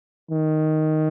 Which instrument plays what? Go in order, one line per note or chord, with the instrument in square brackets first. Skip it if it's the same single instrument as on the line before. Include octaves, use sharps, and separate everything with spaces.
[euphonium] D#3